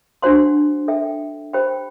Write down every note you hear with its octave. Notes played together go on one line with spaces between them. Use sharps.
D4 F#4 C5 F#5 C6
A4 E5 G5
G4 C5 G5 B5